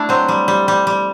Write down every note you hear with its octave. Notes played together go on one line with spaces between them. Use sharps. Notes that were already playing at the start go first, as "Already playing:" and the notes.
Already playing: A3 D4 E4
F#3 C4
G3
G3
G3
G3